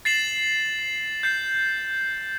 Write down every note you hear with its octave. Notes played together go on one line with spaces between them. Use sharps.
A6 C7 E7 F#7
G6 C7